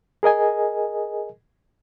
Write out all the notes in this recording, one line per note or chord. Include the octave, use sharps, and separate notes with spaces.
G#4 A#4 D#5 G#5